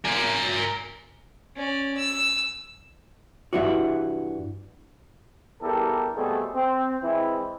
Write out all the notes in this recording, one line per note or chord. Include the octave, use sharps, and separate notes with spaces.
A#4 G#5
C#4 D5
E6
G2 E3 F#4
E2 G2 E4 G4 A4 A#4
B2 G3 A3 C4 G#4 A4
C4
E3 G#3 C4 E4